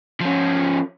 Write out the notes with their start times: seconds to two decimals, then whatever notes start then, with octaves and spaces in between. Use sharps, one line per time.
0.21 F3 C#4